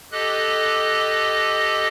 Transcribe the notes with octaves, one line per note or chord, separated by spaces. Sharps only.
G4 A4 D#5 F#6